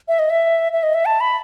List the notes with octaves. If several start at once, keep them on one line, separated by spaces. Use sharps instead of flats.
E5
D#5
E5
E5
D#5
E5
A5
B5